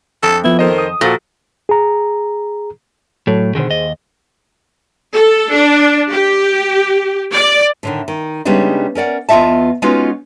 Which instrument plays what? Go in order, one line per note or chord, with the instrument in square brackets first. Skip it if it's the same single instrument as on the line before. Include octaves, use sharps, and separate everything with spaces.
[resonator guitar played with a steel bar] F2 [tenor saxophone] A4
[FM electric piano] F3 B3 [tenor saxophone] E4
[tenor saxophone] D#3 [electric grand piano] A4 C5 D#5
[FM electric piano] D#6
[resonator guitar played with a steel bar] A#2 [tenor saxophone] F3 [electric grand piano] F#4 A4
[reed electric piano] G#4 A#5
[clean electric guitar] A2 [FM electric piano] F#3 A4 C#5
[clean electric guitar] B2 D3 D#3 [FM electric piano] G#4 C5
[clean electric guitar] D#2 D#5
[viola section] A4
D4
G4
D5
[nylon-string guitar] A2 D3 D#3
D#3
C#3 G3 G#3 B3 D4 D#4
C#4 A#4 D5 F#5
E2 B3 F4 D#5 E5 A5
G#3 B3 C#4 D#4 F4 F#4